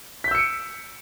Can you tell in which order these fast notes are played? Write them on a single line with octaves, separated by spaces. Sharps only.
B6 G6 E6 C#7 D7